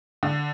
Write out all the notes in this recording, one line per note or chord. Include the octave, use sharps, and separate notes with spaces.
D3